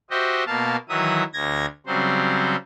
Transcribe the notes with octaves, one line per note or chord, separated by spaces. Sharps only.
F#4 G4 C5 D#5 E5
B2 A#3 F5 A5
D#3 E3 F#3 E5 D#6
D2 G#6 A#6
C#3 F#3 G3 C4 C5